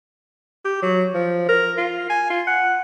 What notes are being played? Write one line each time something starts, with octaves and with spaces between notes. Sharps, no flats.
G4
F#3
F3
A#4
F4
G#5
F4
F#5